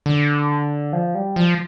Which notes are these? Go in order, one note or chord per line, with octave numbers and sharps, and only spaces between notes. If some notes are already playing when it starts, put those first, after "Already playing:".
D3
F3
G3
F3